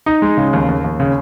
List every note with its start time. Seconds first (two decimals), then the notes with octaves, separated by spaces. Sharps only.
0.06 D#4
0.22 G#3
0.37 C#3
0.53 D#2
0.68 D#2
0.84 D#2
1.00 C#3